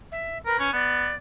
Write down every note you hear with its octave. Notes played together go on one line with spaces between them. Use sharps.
E5
A#4 B4
C#4
B3 D5